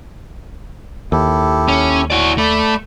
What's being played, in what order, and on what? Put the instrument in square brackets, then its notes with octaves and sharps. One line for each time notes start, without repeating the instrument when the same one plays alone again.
[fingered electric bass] D#2 [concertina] E4 G4 A4
[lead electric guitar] C#4
[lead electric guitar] E4 D5 [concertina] F#4 C#5
[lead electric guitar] A3 [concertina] D5 B5